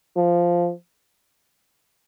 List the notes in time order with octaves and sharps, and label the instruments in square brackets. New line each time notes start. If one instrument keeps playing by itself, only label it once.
[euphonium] F3